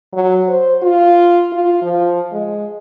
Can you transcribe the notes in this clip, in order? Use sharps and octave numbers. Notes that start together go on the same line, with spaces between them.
F#3
C5
F4
F4
F3
G#3